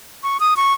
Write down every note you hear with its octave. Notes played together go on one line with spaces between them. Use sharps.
C#6
D#6
C#6